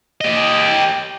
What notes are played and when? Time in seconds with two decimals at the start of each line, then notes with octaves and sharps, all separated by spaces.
0.21 G4 D#5